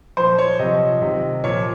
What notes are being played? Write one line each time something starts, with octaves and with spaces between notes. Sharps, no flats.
A#2 F3 C5
C#5
C3 F3 D#5
C3 D#3
A#2 F3 C#5